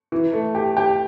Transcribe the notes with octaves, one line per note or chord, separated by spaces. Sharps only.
E3
A3
G4
G4